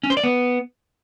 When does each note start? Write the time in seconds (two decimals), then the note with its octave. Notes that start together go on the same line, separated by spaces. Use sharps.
0.03 C#4
0.10 C5
0.17 D5
0.24 B3